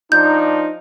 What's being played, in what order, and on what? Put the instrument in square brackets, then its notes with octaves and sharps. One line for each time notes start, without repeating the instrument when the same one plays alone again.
[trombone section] F3 D4 D#4 [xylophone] G6